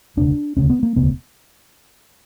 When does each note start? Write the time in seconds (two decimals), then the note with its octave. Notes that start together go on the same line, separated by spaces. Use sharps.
0.17 E1 D2 C#3 D4
0.57 E1 D2 C#3 C#4
0.70 B3
0.83 A#3
0.96 E1 D2 C#3 B3